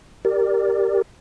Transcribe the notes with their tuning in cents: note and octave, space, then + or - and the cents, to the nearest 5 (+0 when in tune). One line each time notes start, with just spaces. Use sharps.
G4 +0 A#4 -5 D5 +0